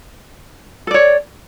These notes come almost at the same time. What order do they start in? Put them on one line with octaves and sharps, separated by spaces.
A4 D5 C#5